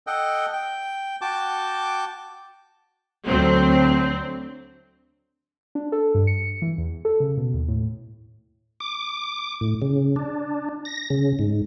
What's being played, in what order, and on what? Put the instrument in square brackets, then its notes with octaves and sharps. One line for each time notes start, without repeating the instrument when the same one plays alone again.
[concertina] A4 D#5 F#5 G5
G5
F#4 G5 A5 D6
[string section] D2 F#3 C4
[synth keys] D4
A4
G2
C#7
E3
E2
A4
C#3
B2
D#2
A2
[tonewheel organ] D6
A2
C#3
D4
A#6
C#3
G#2